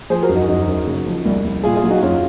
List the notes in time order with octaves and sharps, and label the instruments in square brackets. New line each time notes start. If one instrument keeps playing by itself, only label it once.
[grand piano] F3 G#4 C5
F#4 A#4
F#2
D#4 F#4
F#2 D#4 F#4
F#2
C#3
F3
C2
C2
A#2 F4 G#4
F4 G#4
F#3
D#4 F#4
F#2 C#4 F4